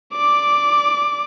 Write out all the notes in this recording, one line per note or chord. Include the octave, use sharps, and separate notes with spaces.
D5 D6